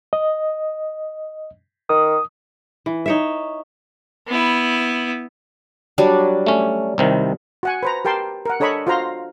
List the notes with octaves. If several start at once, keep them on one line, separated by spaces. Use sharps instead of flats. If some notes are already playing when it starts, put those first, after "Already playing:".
D#5
D#3 D#6
E3
D#4 C#5 E5
B3 E4
F#3 G3 D4
A3 C#4
C2 C3 D#3
F#4 F#5 G#5
B4 C5 A#5
G4 A#4 G5 A5 C6
A#4 F#5
D4 A4 C#5 D#5 B5 C#6
F4 F#4 C5 F5 A#5 C6